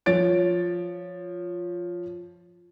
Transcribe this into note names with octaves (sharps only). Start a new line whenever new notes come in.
F3 C#5 A6 D7